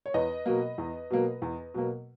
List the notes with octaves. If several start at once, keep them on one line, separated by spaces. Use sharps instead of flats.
C#5
E2 B4 D#5
B2 F#3 A#3
E2
B2 F#3 A#3
E2
B2 F#3 A#3